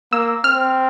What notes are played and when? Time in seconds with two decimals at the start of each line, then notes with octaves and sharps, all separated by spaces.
0.13 A#3 E6
0.44 C4 F6